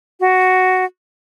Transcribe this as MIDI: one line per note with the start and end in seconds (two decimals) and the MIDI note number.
0.20 0.85 66